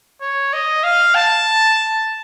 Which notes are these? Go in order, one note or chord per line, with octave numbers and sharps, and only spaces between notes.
C#5
D#5
F5
A5